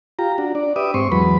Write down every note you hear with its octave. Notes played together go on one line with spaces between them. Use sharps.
F4 G4 A#5
D4 F#4
D4 D5
G4 B4 E5 D6 D#6
G#2 C4 C6 C#6
E2 F#3 G#3 B4 B5